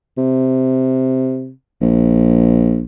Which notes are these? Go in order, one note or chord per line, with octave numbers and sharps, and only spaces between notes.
C3
A#1